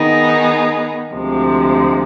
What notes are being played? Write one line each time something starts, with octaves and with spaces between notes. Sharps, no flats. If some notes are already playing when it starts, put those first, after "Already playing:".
Already playing: D#3 B3 D#4 G#4
D2 C3 F3 G#3